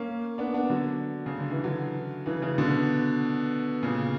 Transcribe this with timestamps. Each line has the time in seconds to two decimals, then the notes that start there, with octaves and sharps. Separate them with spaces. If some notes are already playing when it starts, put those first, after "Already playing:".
Already playing: A#3 C#4
0.38 B3 D4
0.54 B3 D4
0.70 D3 F#3
1.26 C#3
1.39 D3
1.51 E3
1.64 D3 F#3
2.26 C#3 E3
2.42 C#3 E3
2.58 B2 D3
3.83 A#2 C#3